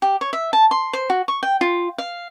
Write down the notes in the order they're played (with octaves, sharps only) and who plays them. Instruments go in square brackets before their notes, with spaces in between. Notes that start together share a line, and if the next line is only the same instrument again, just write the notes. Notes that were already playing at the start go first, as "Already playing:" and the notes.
[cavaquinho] G4
C#5
E5
A5
C6
C5
F#4
C#6
G5
F4
F5